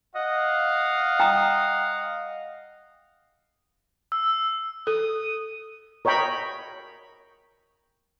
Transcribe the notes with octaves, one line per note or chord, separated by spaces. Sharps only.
D#5 F5 F#5
G5 A#5 D#6
E6
A4 D#6
A#4 C#5 D#5 G5 B5